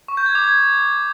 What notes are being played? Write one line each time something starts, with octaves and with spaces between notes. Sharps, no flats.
C#6
G6
G#6
D6
G#6